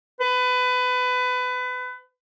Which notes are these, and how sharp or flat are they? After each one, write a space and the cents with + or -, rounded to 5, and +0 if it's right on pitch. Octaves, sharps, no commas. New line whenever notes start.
B4 +25